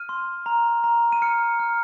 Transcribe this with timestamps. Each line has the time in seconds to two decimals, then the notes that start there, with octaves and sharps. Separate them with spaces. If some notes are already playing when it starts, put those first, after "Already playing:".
Already playing: F6 D#7
0.09 C6
0.46 A#5
0.84 A#5
1.12 D#7
1.22 F6 C#7
1.60 F6